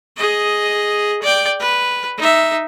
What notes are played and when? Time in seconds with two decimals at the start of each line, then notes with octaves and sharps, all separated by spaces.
0.17 G#4 D#5
1.23 D5 G5
1.60 B4
2.18 D#4 E5